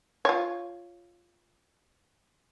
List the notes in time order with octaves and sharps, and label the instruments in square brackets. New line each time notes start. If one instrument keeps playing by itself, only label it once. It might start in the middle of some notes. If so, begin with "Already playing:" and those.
[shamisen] F4 C#5